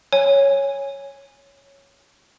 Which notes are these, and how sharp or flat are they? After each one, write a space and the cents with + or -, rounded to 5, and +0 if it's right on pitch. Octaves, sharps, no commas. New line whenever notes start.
C#5 +0 G#5 -15